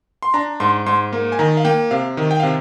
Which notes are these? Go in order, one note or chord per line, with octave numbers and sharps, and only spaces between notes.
C6
D4 A#5
G#2 C6
G#2 C6
A#3
G#5
D#3 A#5
F5
A#3 G5
C3 F5
D#3
G5
C3 F5